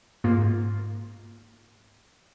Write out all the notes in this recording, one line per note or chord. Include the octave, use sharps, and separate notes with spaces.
G#2 A#3 F4